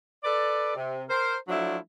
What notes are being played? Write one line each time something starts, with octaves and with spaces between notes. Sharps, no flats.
A4 B4 D5
C3
A#4 C5
F3 F#3 A3 D4 E4